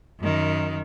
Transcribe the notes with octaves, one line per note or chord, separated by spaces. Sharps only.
F#2 D#3